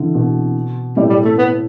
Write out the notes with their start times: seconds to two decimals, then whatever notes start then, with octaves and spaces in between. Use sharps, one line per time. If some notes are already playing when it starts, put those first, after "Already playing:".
Already playing: D3 E3
0.14 B2
0.96 A2 G3
1.10 G3
1.25 A3
1.38 B3